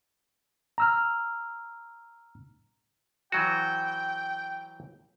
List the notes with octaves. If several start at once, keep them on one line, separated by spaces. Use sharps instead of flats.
A#5 E6 F6
E3 F#3 F#4 G5